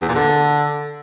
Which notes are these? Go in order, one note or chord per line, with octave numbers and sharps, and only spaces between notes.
E2
A#2
D3